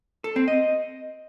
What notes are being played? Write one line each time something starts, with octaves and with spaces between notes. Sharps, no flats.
A4
C4
D#5